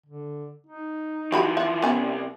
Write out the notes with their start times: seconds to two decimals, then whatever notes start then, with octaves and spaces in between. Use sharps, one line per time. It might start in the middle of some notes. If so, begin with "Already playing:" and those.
0.06 D3
0.67 D#4
1.32 E3 F3 G3 F#4 B5
1.57 E5 F#5
1.82 C2 B3 C#4 G#5 A#5